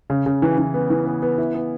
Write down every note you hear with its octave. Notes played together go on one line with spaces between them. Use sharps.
C#3
C#3
E3
E3
B3
E3
B3
B3
E4
B3